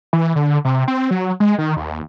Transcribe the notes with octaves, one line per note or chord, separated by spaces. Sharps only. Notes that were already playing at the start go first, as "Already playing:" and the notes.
E3
D3
C3
C4
F#3
G#3
D#3
D#2